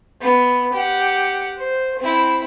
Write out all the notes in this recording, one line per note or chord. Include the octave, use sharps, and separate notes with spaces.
B3
G4 F#5
C5
C4 E4